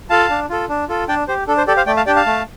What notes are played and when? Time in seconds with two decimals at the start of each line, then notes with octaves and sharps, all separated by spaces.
0.10 F4 A4 F5 A5
0.30 D4
0.50 F4 A4
0.69 D4
0.89 F4 A4
1.08 D4 D5 G5
1.28 G4 C5
1.47 D4 A4
1.57 C5
1.67 G4 A4 D5
1.77 C5 F5
1.86 A3 D5 G5
1.97 F5 A5
2.06 D4 G4 D5 G5
2.16 F5 A5
2.26 A3